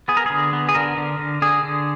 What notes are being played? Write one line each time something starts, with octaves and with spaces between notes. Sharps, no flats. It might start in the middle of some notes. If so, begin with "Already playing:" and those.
B3 G#4
A#4
D3 G#4
B3
G#4
D3 A#4
D3
D3
D3 G#4
D3